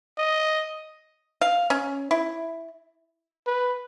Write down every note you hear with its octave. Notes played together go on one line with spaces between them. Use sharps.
D#5
F5
C#4
E4
B4